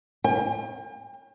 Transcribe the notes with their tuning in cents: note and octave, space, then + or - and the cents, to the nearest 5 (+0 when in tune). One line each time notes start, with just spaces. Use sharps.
G5 +40